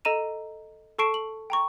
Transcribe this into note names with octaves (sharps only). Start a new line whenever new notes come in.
A4 D#5 A#5 D#7 E7
A4 A5 C#6 C7 D7 E7
F#7
G5 A#5 C#6